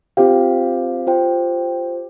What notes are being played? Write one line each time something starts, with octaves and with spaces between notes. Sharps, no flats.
C4 F4 G4 C5 F5
F4 C5 G5